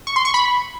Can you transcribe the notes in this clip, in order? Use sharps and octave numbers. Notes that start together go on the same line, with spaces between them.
C#6
C6
C#6
B5